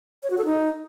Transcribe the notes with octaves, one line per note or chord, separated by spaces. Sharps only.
C#5
F#4
A4
D#4